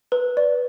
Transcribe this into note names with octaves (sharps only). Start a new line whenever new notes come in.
B4
D5